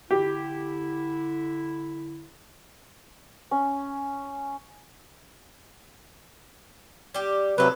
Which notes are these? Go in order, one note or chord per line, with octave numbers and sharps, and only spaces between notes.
D3 E4 G4
C#4
G3 G4
A2 C3 F#3 A4 B4